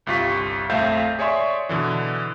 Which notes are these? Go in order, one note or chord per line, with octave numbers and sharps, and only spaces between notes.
G1 C2 G3 F4 C#6 B6
A#1 F2 A3 E5 F5 G6
G#4 C#5 D5 E5 C6 C#6
B2 D3 E3